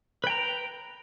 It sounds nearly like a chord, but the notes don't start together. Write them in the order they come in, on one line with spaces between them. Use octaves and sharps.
B4 G5 A#5